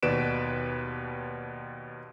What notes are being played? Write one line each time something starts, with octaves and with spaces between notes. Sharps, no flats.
D#2 B2 B4 D5 D7 E7